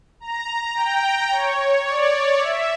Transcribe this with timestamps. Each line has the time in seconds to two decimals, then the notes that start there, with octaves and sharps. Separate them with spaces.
0.20 A#5
0.75 G5
1.30 C#5
1.85 D5
2.39 E5